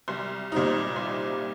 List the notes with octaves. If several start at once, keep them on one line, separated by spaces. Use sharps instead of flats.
C2
A#2 G3 C4 D#4
C2